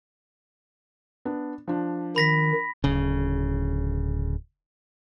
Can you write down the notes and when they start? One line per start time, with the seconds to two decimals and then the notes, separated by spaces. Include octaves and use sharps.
1.25 B3 D4
1.68 F3 D4
2.16 D#3 B5 A#6 B6
2.84 D1 C#3